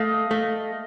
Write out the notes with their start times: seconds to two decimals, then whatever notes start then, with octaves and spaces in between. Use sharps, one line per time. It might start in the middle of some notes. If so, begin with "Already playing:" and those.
Already playing: A3 D#5 F5
0.31 A3